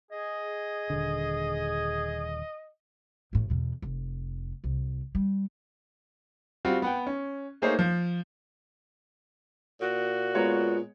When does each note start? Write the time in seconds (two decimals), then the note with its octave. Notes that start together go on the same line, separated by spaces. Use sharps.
0.11 G#4 D#5
0.90 D#1 D3
3.33 A1 A2
3.50 E2 B2
3.82 F1
4.64 C2
5.15 G3
6.65 G3 C4 F4 F#4
6.82 B3 F#5 G5
7.06 C#4
7.62 A3 A#3 D#4 G#4 C5 C#5
7.79 F3
9.81 A#2 F#4
10.35 G#3 B3 F4 C#5 A#5